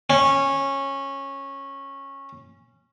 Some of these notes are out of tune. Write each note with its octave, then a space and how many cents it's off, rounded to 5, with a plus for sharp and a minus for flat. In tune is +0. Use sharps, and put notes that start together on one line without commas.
C#4 -15